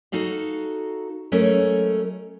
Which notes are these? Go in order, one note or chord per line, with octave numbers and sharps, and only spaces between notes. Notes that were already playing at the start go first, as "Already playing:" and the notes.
D#4 F#4 A4 F5
F#3 G#3 A3 C#4 A4 A#4